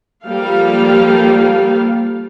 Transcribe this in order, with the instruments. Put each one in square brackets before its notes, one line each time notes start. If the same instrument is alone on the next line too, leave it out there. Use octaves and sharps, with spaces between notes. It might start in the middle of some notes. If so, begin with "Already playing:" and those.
[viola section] F3 G3 A#3 G4 A4 F5